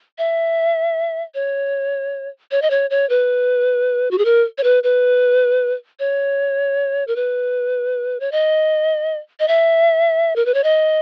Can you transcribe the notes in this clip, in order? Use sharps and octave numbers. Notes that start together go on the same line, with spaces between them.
E5
C#5
C#5
D#5
C#5
C#5
B4
F#4
G#4
A#4
C#5
B4
B4
C#5
A#4
B4
C#5
D#5
D#5
E5
A#4
B4
C#5
D#5